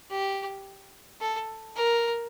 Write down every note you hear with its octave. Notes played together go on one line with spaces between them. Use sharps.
G4
A4
A#4